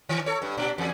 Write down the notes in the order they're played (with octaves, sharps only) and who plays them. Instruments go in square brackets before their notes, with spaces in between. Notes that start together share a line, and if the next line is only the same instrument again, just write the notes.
[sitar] D#3
A4 C#5
G2
A#2 D4
E2 G#4